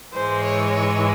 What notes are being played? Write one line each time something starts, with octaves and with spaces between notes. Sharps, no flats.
G#2 E3 G#3 C5
C#5
C#5